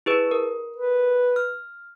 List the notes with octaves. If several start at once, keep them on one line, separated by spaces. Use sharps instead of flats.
E4 G#4 B4
A#4
B4
F6